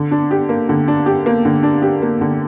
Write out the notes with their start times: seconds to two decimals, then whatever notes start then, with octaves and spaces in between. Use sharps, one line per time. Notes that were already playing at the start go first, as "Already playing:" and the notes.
Already playing: D3
0.11 D4
0.31 G4
0.49 A#3
0.69 D3
0.88 D4
1.06 G4
1.26 A#3
1.45 D3
1.63 D4
1.82 G4
2.02 A#3
2.21 D3